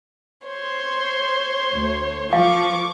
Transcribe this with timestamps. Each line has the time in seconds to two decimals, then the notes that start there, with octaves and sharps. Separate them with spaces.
0.47 C5 C#5 C6
1.74 D2
2.33 F3 F5 C#6 D6